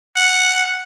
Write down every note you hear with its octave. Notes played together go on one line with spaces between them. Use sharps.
F#5